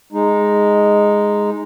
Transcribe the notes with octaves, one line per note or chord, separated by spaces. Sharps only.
G#3 D#4